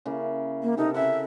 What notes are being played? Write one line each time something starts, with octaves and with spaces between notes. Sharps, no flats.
C#3 A#3 E4
A#3
C3 D#4 A4 A#4
C#3 E4 E5 F#5